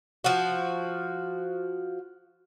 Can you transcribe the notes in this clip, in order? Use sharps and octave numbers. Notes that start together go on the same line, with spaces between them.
F3 F#4